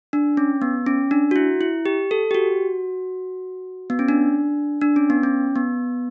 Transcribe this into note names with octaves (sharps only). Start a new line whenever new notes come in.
D4
C#4
B3
C#4
D4
F#4
E4
E4
G4
A4
G4
F#4
B3
C#4
D4
D4
C#4
B3
C#4
B3